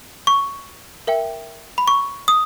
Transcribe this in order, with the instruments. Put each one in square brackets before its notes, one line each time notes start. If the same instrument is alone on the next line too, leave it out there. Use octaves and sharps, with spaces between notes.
[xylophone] C#6
A#4 E5 G5
B5
C#6
D#6